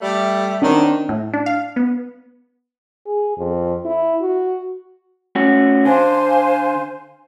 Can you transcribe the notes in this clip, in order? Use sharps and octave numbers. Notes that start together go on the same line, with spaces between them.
G3 A3
D#3 F#3 C4 D4
A2
D4
F5
B3
G#4
F2
E4
F#4
A3 C#4 F#4
D3 C5 F5 G#5